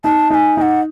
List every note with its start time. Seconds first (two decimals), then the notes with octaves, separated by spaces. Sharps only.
0.04 D#4 A5
0.30 D#4 A5
0.34 G#5
0.57 D#4 F#5 G#5